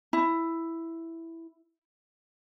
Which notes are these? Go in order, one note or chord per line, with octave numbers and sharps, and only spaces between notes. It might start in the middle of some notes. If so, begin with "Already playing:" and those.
E4